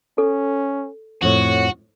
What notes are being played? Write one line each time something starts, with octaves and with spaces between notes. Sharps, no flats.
C#4 A4
F2 A2 F#4 C#5